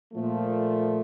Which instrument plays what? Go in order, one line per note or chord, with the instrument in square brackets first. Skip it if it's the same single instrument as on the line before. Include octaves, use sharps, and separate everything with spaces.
[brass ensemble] A#2 F3 A3